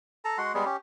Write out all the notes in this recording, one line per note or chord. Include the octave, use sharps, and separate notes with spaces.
A4 A5 A#5
G#3 F#4 F#5 C6
G3 G#3 B3 G#4
C#4 G4